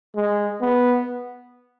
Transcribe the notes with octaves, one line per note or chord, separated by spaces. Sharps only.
G#3
B3